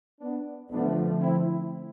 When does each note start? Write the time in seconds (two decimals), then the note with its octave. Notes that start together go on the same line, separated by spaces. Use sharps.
0.20 B3 D4
0.71 D3 F3 A3 B3 D4
1.21 C4 E4